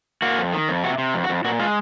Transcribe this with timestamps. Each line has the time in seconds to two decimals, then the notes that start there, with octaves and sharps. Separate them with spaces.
0.22 A#3 F#4
0.38 F2
0.53 D#3
0.68 F2
0.84 C3 F#4
0.98 C3
1.14 F2
1.24 F#4
1.29 F2
1.44 A#2 F#4
1.59 G#3 F4